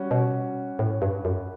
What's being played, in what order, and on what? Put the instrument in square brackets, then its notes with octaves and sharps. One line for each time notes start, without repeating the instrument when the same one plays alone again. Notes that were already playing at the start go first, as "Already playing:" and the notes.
Already playing: [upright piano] G3 C#4 F#4
[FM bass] B2
A2
G2
F#2